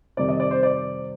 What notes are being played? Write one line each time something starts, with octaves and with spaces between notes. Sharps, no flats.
F2 C3 D#3 G3 D5
D#5
D5
C5
D5